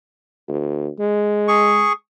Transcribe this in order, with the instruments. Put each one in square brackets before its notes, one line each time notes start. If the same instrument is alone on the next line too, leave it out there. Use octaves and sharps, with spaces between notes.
[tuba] D2
G#3
[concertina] G#4 C#6